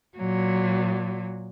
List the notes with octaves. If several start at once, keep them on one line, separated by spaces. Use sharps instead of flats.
A#2 F#3